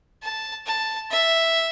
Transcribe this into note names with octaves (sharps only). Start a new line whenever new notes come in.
A5
A5
E5